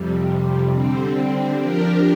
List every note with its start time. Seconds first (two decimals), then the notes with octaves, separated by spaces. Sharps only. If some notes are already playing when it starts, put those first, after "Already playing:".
Already playing: F2 C3 G3
0.72 D3 G3 C4
1.57 F3 D4 G4 A#4